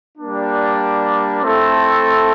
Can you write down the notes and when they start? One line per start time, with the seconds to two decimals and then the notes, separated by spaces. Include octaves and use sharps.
0.18 G3 A#3 D4
1.42 A3 C4 E4 A4